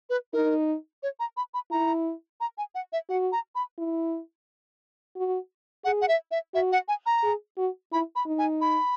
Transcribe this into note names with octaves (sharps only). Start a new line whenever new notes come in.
B4
D#4 A#4
C#5
A#5
B5
B5
E4 A#5
A#5
G#5
F#5
E5
F#4 F#5
A#5
B5
E4
F#4
G#4 F#5
F#5
E5
E5
F#4 E5
F#5
G#5
A#5
G#4
F#4
E4 B5
B5
D#4
G#5
B5